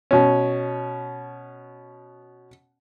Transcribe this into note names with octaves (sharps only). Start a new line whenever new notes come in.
B2 C#4